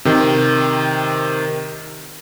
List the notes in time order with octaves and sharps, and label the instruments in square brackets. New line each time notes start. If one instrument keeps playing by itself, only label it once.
[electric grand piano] C3 D#3